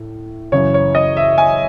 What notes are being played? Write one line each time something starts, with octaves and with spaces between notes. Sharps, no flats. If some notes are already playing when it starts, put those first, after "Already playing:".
Already playing: A2
F#2 C#3 E3 C#5
C#5
D#5
E5
G#5